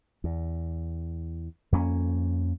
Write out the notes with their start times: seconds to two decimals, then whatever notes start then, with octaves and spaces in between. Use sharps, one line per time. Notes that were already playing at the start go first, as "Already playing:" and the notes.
0.24 E2
1.72 F2 A#3 C#4